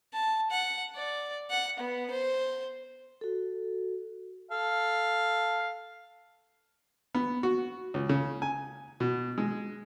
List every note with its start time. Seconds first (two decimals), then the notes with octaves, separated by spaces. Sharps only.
0.13 A5
0.51 F#5
0.95 D5
1.50 F#5
1.79 B3
2.10 C5
3.21 F#4 A4
4.52 A4 F5
7.15 B3
7.43 F#4
7.94 C#2
8.09 C#3
8.42 G#5
9.00 B2
9.38 G#3